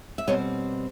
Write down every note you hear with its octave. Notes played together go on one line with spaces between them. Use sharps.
E5
B2 G3 C4 C#5 D#5